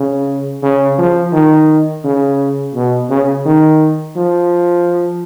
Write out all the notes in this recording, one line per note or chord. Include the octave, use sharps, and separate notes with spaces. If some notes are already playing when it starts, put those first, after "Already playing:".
Already playing: C#3
C#3
F3
D#3
C#3
B2
C#3
D#3
F3